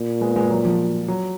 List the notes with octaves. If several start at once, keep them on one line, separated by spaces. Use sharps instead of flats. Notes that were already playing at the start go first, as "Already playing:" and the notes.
Already playing: A#2
G#3 B3
G#3 B3
F#3
F3
F#3